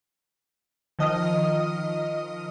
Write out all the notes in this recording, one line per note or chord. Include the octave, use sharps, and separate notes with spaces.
D#3 F3 D#5 D#6 F6